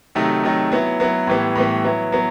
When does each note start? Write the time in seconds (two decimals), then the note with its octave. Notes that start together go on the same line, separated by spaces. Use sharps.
0.15 C3 D#3 F#3 A3 D#4
0.43 C3 D#3 F#3 A3 D#4
0.72 F#3 B3 E4
1.00 F#3 B3 E4
1.27 A2 E3 G3 B3
1.55 A2 E3 G3 B3
1.84 F#3 B3 E4
2.12 F#3 B3